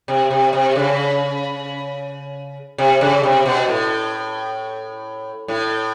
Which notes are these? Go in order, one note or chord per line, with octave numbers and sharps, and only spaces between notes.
C3
C3
C3
C#3
C3
C#3
C3
B2
A2
A2